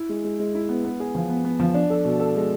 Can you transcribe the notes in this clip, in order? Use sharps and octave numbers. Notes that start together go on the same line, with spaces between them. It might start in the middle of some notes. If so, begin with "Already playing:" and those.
Already playing: E4
G#3
G#3
G#3
E4
B3
B3
G#4
F3
B3
B3
F3
D4
A4
B2
A4
G#3